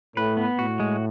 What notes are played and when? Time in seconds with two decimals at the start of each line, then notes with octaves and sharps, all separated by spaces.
0.16 A2 B4
0.37 B3
0.58 A2 F#4
0.80 G#3